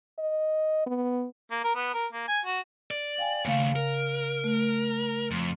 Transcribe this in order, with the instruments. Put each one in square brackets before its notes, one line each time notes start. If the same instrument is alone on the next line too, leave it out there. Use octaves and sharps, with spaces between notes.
[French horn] D#5
B3
[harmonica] A#3
A#4
B3
A#4
A#3
G#5
F#4
[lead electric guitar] D5
[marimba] F5 G5 G#5
[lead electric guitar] D#2 A3 [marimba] C#3 F5
[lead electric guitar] A#4
[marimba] A3
[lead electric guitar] F2